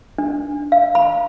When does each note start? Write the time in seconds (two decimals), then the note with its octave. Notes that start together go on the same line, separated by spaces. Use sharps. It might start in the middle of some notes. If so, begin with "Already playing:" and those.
0.18 D4
0.72 F5
0.95 B5